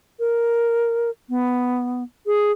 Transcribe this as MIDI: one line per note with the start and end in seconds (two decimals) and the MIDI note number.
0.20 1.10 70
1.29 2.03 59
2.26 2.52 68